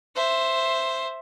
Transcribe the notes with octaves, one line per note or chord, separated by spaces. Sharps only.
C5 E5